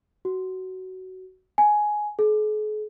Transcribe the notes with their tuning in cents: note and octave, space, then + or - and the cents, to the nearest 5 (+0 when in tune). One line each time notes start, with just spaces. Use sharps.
F#4 +15
G#5 +10
G#4 +45